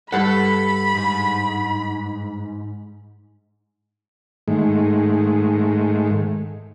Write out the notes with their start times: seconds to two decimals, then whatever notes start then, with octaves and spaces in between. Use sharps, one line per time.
0.12 G2 A4 F#5 B5
0.94 G#2
4.48 G#2 D#3 G#3 A3